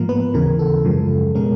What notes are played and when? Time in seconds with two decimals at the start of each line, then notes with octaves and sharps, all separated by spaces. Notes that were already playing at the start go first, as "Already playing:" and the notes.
Already playing: G#2 F3 A#3 A#4
0.09 B3 B4
0.34 D#2 C#3 E3 A#4
0.59 A4
0.84 F#2 C#3 F3 G#3
1.35 B2 G#3 C#4 A#4